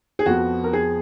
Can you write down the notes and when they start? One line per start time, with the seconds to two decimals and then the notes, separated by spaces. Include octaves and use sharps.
0.19 G#4
0.26 F2 F3 B3 F#4
0.64 A#4
0.73 G#4